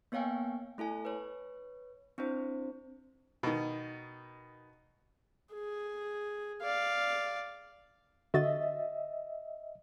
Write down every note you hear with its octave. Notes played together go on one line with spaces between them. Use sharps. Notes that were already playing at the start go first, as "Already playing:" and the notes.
A#3 B3 C#5 F5 G5 G#5
A3 E4 A4 G#5
B4 C#5
C4 D4 E4 C5
B2 D#3
G#4
D5 F5
D3 F#4 D#5 E5 A6